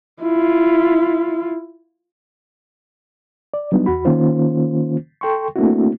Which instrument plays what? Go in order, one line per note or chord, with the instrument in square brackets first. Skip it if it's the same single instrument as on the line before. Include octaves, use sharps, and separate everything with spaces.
[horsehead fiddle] E4 F4
[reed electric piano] D5
F#3 G3 B3 D4 D#4
E2 F#4 B5
D#3 A#3 C#4 F4 C5
A4 G5 C6 C#6
A3 A#3 C4 D4 E4 F#4